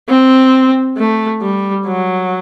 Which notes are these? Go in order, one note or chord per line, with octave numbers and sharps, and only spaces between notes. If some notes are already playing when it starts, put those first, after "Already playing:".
C4
A3
G3
F#3